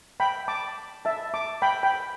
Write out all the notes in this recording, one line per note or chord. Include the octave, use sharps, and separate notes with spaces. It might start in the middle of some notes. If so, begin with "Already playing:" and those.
G5 B5
A5 D6
E5 A5
A5 D6
G5 B5
G5 B5